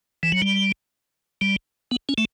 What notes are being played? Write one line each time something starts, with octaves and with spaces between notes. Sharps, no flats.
E3
F#3
G3
G3
B3
C#4
A3